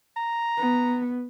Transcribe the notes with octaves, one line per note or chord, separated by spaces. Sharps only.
A#5
B3